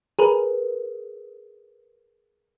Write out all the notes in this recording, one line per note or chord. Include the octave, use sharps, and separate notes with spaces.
G#4 A#4 B4